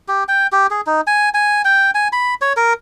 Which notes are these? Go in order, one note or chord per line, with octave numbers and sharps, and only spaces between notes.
G4
G5
G4
G#4
D#4
G#5
G#5
G5
G#5
B5
C#5
A#4